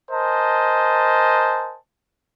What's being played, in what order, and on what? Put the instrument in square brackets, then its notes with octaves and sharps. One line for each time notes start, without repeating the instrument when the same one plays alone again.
[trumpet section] A#4 C5 D#5 G#5 A5